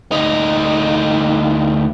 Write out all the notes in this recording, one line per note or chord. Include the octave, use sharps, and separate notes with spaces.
D2 D#4